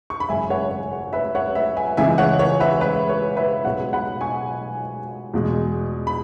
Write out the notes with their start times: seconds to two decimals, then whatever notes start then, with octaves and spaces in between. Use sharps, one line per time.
0.10 C#6
0.20 B5
0.29 G#1 F#2 C#3 E5 G#5
0.50 C#5 F#5
0.71 C#5
0.93 C#5
1.13 B4 E5
1.35 C#5 F#5
1.55 B4 E5
1.77 E5 G#5
1.97 C#2 C#3 E3 G#3 E5 G#5
2.18 C#5 F#5
2.39 C#5
2.60 B4 E5
2.81 B4 E5
3.09 C#5
3.37 B4 E5
3.65 B1 B2 G#3 C#5 F#5
3.93 F#5 B5
4.21 G#5 C#6
5.34 E2 B2 G#3
6.07 B5